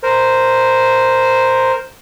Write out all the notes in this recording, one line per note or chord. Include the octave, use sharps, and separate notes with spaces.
A#4 C5